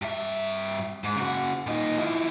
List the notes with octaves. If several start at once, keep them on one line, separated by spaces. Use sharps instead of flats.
G2 E5
G#2
C#3 F#4
A#2 D#4
F3 E4